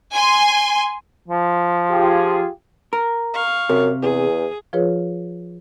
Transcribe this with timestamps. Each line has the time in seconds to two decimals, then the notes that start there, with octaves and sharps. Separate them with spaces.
0.13 G#5 C6
1.28 F3
1.91 F4 G4 G#4
2.93 A#4
3.34 F5 C#6
3.69 F#2 C3
4.02 E2 G#4
4.73 F3 F4 G#4 B4 C#5